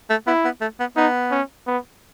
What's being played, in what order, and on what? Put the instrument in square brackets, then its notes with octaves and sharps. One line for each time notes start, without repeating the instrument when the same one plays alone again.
[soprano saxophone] A3
[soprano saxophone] B3 [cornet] E4
[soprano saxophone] B3
A3
B3
[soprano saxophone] B3 [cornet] D#4
[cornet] C#4
B3